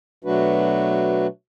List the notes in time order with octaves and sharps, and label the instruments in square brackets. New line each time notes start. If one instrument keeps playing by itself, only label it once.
[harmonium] B2 F#3 A3 D4 F#4 B4